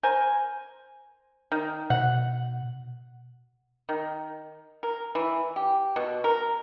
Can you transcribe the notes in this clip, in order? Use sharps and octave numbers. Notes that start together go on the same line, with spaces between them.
A#4 C5 G#5
D#3
B2 F#5
D#3
A#4
E3
G4
B2
A#4